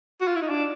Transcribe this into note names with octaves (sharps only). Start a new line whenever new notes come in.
F#4
F4
E4
D#4
D4